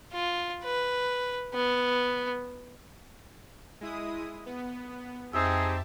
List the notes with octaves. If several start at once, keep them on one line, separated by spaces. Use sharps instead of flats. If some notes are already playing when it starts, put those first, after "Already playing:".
F4
B4
B3
G#3 E4 D#6
B3
F2 C4 D#4 G4 G#4 E5 A5 E6